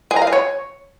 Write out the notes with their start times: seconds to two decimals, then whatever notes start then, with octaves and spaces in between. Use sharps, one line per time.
0.11 G#4
0.16 A#5
0.22 F5
0.27 G#4
0.33 C#5